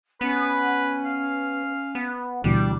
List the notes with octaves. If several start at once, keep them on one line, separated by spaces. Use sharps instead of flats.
B3 C#4 B4
F5
B3
D2 B2 E3 G3 D4